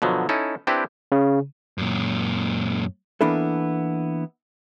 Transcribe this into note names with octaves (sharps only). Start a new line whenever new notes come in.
B2 D3 F3 F#3
C#4 D#4 E4 A4
C4 D4 E4 G4 B4
C#3
F#2 A#2
E3 A#3 B3 D4 E4 A4